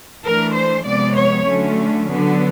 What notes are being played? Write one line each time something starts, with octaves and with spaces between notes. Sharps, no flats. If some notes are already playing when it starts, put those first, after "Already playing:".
E3 A3 D4 A#4
C5
C3 F3 G#3 B3 D5
C#5
D3 F#3 A3 C#4
D3 F#3 B3